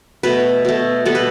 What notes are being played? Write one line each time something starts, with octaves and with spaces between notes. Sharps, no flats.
B2 A3 B4
B2 A3
B2 G3 B3 A4
B4